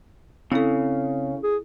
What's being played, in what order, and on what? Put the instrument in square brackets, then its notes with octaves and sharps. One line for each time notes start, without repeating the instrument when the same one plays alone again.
[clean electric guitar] C#3 [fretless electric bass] C4 [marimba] E4 A4
[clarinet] G#4